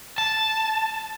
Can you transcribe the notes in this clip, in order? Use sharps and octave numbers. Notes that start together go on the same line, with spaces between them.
A5